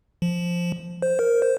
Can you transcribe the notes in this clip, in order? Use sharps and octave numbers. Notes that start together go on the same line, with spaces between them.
F3
C5
A#4
C5